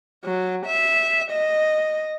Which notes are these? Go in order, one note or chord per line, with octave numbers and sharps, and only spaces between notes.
F#3
E5
D#5